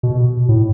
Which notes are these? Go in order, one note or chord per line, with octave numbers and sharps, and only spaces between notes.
B2
A2